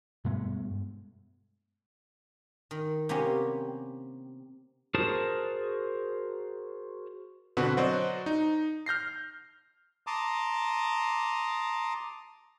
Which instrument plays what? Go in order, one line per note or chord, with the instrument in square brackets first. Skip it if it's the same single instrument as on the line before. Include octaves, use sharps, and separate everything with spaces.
[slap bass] G2 B2 G#3 A3
[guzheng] D#3
C3 A#3 B3 C#4 G4
[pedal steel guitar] F#4 G#4 A#4 C5 A5
[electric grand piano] B2 D3 C4 F#4 B4
F#3 F#4 C5 D5 D#5
D#4
F6 G6 A#6 C7
[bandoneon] A5 A#5 C6 D6 D#6